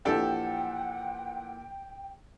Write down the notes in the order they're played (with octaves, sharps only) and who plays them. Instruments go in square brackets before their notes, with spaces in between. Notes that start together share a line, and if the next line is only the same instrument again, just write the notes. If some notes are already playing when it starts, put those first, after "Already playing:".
[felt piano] A#2 E3 F3 [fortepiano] D4 G4 A4 [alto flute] F#5 [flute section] G5